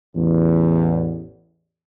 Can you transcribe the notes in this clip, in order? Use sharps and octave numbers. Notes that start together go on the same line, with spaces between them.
A1 E2